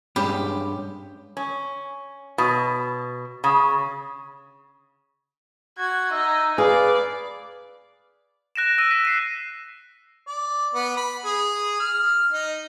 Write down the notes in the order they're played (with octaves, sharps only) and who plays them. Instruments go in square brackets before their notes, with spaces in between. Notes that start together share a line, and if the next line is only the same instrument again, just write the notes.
[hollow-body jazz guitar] G2 G#3 C#4 [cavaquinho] G4 B5
[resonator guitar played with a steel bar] C#4
B2
C#3
[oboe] F#4 [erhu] G#6
[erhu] D#4 [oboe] E5
[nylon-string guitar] G#4 [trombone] B4 [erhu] D5 [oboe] F5
[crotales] F#6 A#6 D7 E7
E6 A#6 D#7
B6
C7 D#7
[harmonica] D5
B3
B5
G#4
F6
D#4